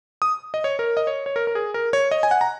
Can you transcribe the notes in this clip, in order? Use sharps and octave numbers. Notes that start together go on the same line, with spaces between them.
D#6
D#5
C#5
A#4
D#5
C#5
C#5
A#4
A#4
G#4
A#4
C#5
D#5
G#5
F#5
A#5